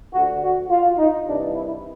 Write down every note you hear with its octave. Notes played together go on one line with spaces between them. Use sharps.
D2 D3 F#4
F#4
F4
D#4
C2 C3 E3 D4
E4